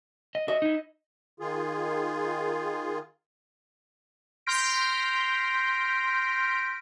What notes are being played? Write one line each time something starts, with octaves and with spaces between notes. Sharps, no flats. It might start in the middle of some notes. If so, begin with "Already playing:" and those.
D#5
F#4 D#5 E5
D#4 E4
D#3 F4 G#4
C6 F6 G6 A#6 B6 D7